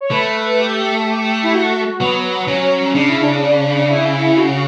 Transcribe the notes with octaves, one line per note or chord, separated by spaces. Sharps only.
C#5
A3 B4
G4
A4
G4
E4
F#4
F#3 B3
F#3 C#4
C#3 D4
E4
D4
E4
F#4